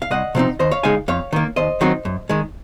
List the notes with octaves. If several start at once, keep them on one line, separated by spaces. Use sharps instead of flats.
F5
C2 D#5 F#5
C3 F3 C4 D#4
D#2 C5 D#5
C#5 F5
C#3 G#3 D#4 F5 G#5
F2 C#5 F5
D#3 A#3
D#2 C5 D#5
D#3 F#3 C4 D#4
F#2
D#3 G#3